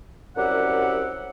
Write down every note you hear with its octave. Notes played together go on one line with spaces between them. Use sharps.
C2 F#2 G4 D5 E5 F#5